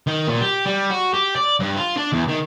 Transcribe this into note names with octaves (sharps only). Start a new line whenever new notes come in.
D#3
A#2
G4
G3
F#4
G4
D5
G2
F4
D4
E2
D#3